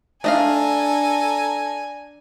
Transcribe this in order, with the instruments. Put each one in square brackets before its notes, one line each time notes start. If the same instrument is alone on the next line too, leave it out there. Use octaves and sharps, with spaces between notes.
[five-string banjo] A3 D#5 F5 [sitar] D4 [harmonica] A4 A#5 [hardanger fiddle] G#5